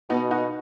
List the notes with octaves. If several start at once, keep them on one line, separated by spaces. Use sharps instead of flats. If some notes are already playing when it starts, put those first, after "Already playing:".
B2 B3 D#4
D#4 F#4